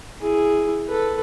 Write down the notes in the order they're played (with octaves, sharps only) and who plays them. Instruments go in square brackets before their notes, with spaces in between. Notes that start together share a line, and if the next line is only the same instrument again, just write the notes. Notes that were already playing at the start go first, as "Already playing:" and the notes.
[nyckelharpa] E4 G#4
A4 B4